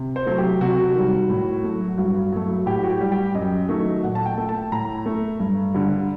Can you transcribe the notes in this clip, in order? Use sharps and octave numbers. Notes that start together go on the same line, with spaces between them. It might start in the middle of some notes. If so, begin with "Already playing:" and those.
Already playing: C3
C5
F#3 A3
G4
C3 F#4
D#3 G3
A2
F#3 A3
G2 F#4
F#3 A3
A2 G4
F#4
G4
G3
G4
F#2 D#5
D#3 F#3 A3
A#2 F#5
A5
G5
A3
A5
A2 A#5
A3
G2
D3 G3